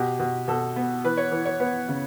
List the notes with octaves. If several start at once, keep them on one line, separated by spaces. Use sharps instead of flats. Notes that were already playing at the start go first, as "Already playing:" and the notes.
Already playing: B2 G4
B2
B2 A4
B3
E3 B4
C#5
E3 B4
C#5
B3 B4
C#3